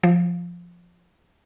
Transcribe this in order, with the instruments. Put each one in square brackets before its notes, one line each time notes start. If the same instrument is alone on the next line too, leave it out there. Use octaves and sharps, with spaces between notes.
[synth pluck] F3